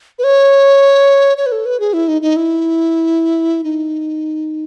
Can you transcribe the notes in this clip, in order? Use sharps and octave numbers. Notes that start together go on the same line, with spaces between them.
B4
C#5
C#5
B4
A4
B4
G#4
E4
D#4
D#4
E4
D#4